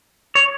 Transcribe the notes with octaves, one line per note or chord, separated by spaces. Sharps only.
C#5